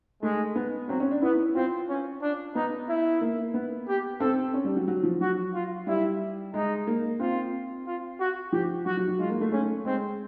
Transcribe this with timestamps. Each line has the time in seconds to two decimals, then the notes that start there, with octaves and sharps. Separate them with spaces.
0.23 G#3 A3
0.56 B3
0.89 F#3 C4
1.00 C#4
1.11 D4
1.22 B3 E4
1.55 C4 F4
1.89 C#4
2.22 D4
2.55 B3 D#4
2.89 E4
3.21 A#3
3.54 B3
3.88 G4
4.20 C4 A4
4.54 C#4
4.65 G3
4.76 F#3
4.88 F#3
5.03 F3
5.21 F#3 F#4
5.54 F4
5.87 G3 E4
6.54 G#3 D#4
6.87 A#3
7.20 C4 F4
7.86 F4
8.20 F#4
8.52 F3 G4
8.86 F#3 F#4
8.97 F#3
9.08 F#3
9.18 G#3 F4
9.30 A#3
9.41 A3
9.52 A3 C#4
9.85 G#3 C4